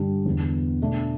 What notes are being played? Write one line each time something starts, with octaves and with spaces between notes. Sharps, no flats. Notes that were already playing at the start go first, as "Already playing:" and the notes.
Already playing: G2 D3 G3 D4
E2 D3 B3
B2 A3 D4